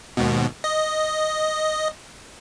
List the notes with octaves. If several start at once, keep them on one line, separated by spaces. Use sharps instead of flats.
D#2 G#2 B2
D#5